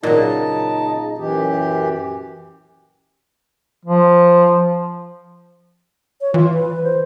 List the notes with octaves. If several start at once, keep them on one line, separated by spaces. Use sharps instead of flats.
A#2 C#3 F#3 D#4 A5
F#2 E3 G4
F3
C#5
E3 F4
B4
C5